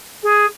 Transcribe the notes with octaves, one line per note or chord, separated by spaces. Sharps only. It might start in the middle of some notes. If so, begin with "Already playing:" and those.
G#4